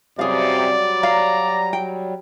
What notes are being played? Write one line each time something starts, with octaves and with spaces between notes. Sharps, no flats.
F#2 C3 F#3 G3 G#4 D5 F5
F5 A#5
G5